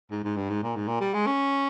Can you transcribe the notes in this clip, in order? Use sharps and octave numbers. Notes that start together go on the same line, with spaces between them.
G#2
G#2
G2
G#2
A#2
G#2
A#2
G3
G#3
C#4